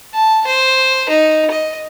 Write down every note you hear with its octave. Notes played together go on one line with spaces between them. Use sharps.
A5
C5
D#4
D#5